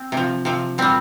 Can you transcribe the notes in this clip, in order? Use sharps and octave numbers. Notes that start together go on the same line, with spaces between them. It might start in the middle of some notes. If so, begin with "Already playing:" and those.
Already playing: C4
C3 F3
C3 F3
A#2 G3 C4